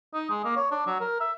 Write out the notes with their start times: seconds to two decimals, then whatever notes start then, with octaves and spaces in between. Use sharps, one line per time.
0.14 D#4
0.30 G#3
0.44 A#3
0.56 C#5
0.71 D4
0.87 F#3
1.00 A#4
1.20 E5